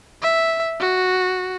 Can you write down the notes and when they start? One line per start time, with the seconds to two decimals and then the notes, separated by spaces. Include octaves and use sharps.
0.22 E5
0.80 F#4